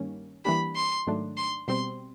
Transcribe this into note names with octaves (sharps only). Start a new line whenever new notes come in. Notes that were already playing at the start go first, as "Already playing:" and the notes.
Already playing: G2 D#3 G3 A#3 C#4
E3 G3 A#3 D4 G4 B5
C6
G#2 D#3 F#3 A3 D4
C6
B2 G3 C4 C6